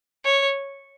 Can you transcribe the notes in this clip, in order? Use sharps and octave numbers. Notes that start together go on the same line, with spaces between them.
C#5